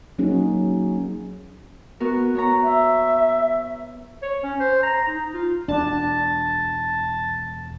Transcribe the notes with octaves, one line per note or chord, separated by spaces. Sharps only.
F#3 A#3 C#4 D#4 F#4 G#4
B3 F#4 A#4
B3 C#5 A#5
E5
C#5
C#4
C5
A#5
D#4
F4
E1 D4 A5